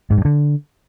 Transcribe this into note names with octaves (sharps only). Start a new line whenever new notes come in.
G#2
G2
D3